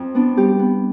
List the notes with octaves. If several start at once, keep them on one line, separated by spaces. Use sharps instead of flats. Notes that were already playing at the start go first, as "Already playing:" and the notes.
Already playing: F2
B3 D4
G3 G4
B3